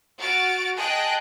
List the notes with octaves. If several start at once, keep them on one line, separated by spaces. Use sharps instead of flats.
F#4 F6 A6 D7
G#4 D#5 G5 A5 F#6 D7